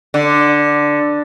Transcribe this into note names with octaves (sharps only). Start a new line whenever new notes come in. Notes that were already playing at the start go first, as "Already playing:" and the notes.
D3